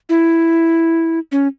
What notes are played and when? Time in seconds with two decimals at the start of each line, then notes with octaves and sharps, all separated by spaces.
0.09 E4
1.32 C#4